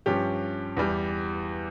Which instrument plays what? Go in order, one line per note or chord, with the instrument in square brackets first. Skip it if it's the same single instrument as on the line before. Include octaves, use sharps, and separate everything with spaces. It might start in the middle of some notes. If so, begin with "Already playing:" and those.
[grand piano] G2 F3 C#4 G4
E2 E3 G3